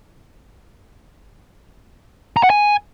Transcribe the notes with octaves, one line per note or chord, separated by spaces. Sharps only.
A#5
F#5
G#5